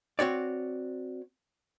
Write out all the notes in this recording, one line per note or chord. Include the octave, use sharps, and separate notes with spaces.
C4 F#4 C#5 D5